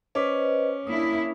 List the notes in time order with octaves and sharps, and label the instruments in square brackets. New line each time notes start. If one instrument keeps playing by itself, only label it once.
[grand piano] C#4 D6 B6 [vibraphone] B4 C5 D#5
[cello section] A#3 D4 E4 [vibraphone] D#6